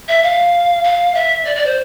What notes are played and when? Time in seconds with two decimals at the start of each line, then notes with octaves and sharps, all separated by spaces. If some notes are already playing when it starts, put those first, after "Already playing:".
0.08 E5
0.23 F5
0.84 F5
1.15 E5
1.45 D5
1.56 D5
1.66 C5